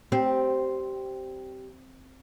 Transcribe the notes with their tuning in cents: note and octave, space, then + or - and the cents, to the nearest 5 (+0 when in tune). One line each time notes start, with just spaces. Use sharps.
G3 -20 C4 +0